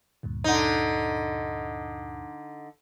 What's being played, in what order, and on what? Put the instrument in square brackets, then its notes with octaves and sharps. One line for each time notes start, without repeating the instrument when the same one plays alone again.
[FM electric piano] D2 G2 A#2
[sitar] D3 D#4